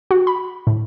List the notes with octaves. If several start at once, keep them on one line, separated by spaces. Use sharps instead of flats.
F#4
B5
A2